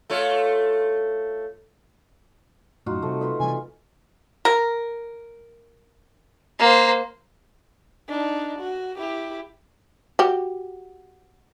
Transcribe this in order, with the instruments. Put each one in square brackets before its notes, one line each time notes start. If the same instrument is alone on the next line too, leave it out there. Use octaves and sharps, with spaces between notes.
[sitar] A3 F4 C#5
[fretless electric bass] F#2 A2 [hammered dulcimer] D#4 F4 F#4
[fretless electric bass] C3 G3 C4 [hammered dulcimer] A3
[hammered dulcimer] F4 B4 D#5
[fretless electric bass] C3 E3 G3 [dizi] G#5
[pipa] A#4
[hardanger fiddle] A#3 C5
[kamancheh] D4 D#4
F#4
E4 G4
[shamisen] F#4 G4